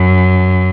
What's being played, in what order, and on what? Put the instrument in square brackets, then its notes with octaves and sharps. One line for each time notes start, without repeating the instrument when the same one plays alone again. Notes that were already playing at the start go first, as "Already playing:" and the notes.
Already playing: [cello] F#2